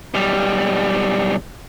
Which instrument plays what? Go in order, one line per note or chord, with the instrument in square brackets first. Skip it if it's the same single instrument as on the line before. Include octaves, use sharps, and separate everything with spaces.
[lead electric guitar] B1 G3